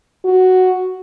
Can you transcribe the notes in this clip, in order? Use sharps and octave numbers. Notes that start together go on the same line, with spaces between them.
F#4